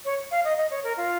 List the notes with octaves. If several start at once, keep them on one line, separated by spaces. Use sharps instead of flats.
C#5
F5
D#5
D#5
C#5
A#4
F4